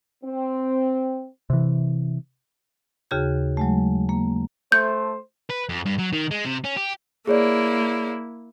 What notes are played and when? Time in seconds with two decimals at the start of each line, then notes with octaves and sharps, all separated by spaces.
0.24 C4
1.50 C3 E3
3.11 D#2 C#3 F#4 G#4 G6
3.57 F#3 G#3 A3
4.09 A#3
4.72 A3 C5 G6
5.50 B4
5.69 F2
5.86 G2
5.99 F#3
6.13 D#3
6.31 G#3
6.45 C3
6.65 C#4
6.77 G4
7.27 A#3 E4 G#4 C#5 D5